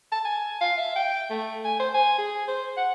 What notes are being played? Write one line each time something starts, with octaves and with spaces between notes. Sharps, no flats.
A5
G#5
F5
E5
G5
A3
G#5
C5
G#5
G#4
C5
F#5